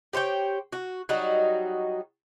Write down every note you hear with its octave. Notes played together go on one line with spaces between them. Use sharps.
G4 C5 C#5 G5
F#4
F#3 G3 D#4 F#4